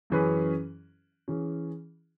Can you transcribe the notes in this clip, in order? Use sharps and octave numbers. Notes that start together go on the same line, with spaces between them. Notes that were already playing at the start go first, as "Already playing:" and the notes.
F#2 E3 C#4 G#4 B4
E3 C#4 G#4